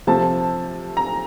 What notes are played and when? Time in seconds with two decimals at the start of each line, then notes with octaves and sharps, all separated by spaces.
0.07 C3 F3 A3 A5
0.97 A#5